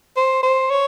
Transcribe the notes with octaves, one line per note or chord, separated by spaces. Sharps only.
C5
C5
C#5